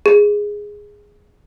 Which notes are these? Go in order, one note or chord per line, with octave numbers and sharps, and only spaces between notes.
G#4